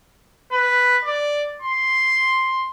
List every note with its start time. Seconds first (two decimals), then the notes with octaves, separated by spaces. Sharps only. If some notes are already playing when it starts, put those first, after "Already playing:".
0.52 B4
1.04 D5
1.62 C6